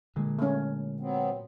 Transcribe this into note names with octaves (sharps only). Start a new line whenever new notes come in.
A#2 D3 G#3
A3 C#4
F#3 B3 C4